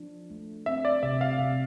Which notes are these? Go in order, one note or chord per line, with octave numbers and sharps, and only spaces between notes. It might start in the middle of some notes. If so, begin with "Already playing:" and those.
Already playing: F3 D4
A3
C4 E5
D5
C3 E5
F5
C3